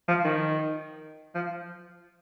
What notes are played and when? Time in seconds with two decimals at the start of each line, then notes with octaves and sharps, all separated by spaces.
0.08 F3
0.24 D#3
1.35 F3